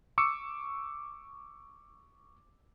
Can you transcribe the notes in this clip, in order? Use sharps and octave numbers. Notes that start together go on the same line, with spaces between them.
C#6 D6 E6 C#7